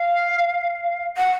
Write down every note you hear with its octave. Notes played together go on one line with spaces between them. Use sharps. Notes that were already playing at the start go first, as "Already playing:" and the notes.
Already playing: F5
F#5